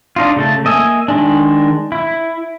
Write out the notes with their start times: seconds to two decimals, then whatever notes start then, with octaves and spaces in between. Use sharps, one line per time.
0.16 D4 D#4 F4
0.37 C#3 A3 A5
0.65 A#3 D#5 E5 G#5
1.08 D#3 G#3 D4
1.92 E4